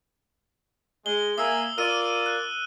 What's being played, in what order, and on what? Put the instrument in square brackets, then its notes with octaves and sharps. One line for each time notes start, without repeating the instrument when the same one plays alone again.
[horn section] G#3 [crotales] G7
[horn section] A#3 E5 G#5 [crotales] D#6 E6
[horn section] F4 A#4 D5 [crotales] E6 D#7
[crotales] F#6